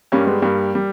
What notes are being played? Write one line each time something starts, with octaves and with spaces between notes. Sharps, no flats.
G2 G3 A#3 C#4
G#3 B3
G2 G3 A#3
G3